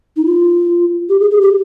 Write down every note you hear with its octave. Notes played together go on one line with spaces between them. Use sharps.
D#4
F4
G4
G#4
G#4
G4